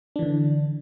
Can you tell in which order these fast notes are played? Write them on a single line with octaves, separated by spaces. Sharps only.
D4 E3 D3